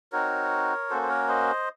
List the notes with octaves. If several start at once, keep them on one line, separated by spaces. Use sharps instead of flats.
C4 D#4 F#4 A#4 C#5
A#3 C#4 F#4 A4 C5
C5
A#4 C#5
C5 D#5